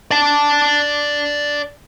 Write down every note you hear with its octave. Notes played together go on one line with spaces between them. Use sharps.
D5 A5